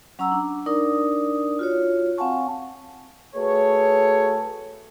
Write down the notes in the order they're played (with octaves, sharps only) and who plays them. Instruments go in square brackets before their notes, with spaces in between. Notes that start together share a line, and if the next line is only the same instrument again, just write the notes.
[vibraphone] F#3 C#4 F#5 A#5 E6
D4
D4 D#4 A#4 D5 D#6
F4 F#4 C#5
C4 F5 F#5 G#5 A5 C#6
[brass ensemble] A3 F#4 G#4 A4 B4 C#5